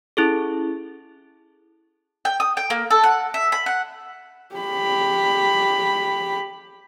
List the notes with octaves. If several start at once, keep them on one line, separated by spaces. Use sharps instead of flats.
C#4 E4 G#4 A4
G5
D#6
G5
A#3
A4
F#5
E5
B5
F#5
G4 B5